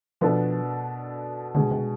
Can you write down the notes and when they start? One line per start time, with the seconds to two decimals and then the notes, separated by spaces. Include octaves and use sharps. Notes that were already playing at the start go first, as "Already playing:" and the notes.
0.21 B2 F3 B3 D4 A4
1.55 B2 D3 G#3 D4 G#4
1.71 C3